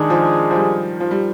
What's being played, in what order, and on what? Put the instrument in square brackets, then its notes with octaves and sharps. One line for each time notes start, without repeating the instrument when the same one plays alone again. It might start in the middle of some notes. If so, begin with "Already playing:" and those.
Already playing: [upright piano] D#3 [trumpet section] G#3 D4 G#4
[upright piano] F3
F3
G3
F3
G3